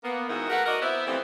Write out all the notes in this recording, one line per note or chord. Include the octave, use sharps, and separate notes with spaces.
A#3 B3
G#2 D#3 D#4 E4 F#4
A3 A#4 B4 F#5
F#4 A#4 D5 D#5
B3 C4 E4 C5 E5
E3 F3 G3 A3 B3 C4